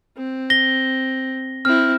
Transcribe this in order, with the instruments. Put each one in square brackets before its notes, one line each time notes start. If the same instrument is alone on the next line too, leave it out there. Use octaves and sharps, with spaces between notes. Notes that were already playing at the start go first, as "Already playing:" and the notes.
[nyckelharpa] C4
[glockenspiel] A#6 G7
[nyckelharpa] C4 E4 [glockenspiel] F6